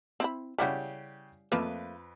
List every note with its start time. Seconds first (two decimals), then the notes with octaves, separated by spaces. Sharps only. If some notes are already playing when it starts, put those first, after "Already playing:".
0.20 C4 E4 B5
0.58 C#3 G3 E4 F#4 G4
1.52 F2 F3 A3 A#3 B4